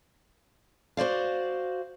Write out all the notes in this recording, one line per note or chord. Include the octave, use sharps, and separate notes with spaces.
F#4 C5 D5 F5